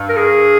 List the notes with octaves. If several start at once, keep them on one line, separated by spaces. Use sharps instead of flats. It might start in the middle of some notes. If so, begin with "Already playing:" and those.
Already playing: G2
A#4
G#4